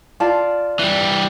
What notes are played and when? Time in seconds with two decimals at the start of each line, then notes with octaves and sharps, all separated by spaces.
0.20 F4 D5 A5
0.79 E3 G3